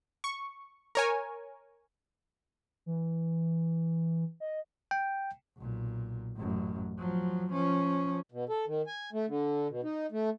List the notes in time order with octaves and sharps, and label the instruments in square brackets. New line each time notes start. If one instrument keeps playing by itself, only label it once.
[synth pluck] C#6
A#4 C#5 G#5
[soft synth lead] E3
D#5
[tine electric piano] G5
[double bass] B1 A#2
A1 F#2
F3 F#3
F3 C#4
[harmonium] B2
A4
D#3
G#5
A3
D3
B2
D#4
A3